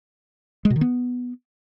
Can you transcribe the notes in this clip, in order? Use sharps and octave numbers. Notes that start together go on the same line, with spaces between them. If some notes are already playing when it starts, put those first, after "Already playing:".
G#3
B2
D#3
B3